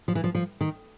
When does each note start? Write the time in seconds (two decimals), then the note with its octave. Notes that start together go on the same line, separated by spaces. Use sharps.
0.08 F3
0.15 E3
0.24 F3
0.35 F3
0.61 D#3